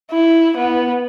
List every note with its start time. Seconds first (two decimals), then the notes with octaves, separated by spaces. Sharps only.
0.11 E4
0.57 B3